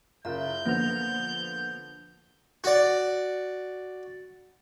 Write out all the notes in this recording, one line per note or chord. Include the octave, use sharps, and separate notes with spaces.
F#1 F4 A#4 E5 G6
D3 F3 A#3 B3 F7
F#4 D5